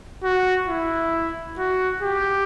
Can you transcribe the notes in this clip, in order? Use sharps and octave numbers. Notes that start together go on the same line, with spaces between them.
F#4
E4
F#4
G4